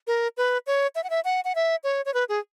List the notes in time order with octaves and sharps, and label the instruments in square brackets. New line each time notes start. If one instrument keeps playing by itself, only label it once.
[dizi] A#4
B4
C#5
E5
F#5
E5
F#5
F#5
E5
C#5
C#5
B4
G#4